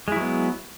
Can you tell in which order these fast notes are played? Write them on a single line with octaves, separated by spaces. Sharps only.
G#3 E4 F#3 B3